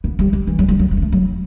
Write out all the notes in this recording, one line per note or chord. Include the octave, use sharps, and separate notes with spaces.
B3
G3
G3
E3
F#3
G3
F#3
F#3
B3
A3
F#3